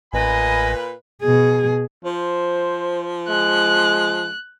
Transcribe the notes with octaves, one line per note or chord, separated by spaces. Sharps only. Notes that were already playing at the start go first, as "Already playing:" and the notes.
A1 A#2 B4 D#5 G#5 B5
B2 G#4
F3 C5
G#3 F#6